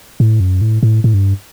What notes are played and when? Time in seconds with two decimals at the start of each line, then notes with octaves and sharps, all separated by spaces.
0.20 A2
0.40 F#2
0.61 A2
0.83 A2
1.04 A2
1.14 G2